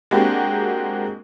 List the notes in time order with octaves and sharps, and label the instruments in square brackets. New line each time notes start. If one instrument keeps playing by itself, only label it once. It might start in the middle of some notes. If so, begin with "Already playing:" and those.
[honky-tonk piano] G#3 A#3 C4 D4 F#4 G4